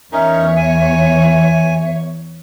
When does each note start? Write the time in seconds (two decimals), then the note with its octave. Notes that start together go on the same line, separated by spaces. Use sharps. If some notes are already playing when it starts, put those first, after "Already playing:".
0.13 E2 C#4 D#4 A#4 C#5 E5
0.57 G#5